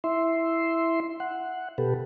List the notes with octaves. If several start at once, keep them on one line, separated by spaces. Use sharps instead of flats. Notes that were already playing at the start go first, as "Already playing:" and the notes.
E4 E5 C6
F#5
B2 G4 A4 B4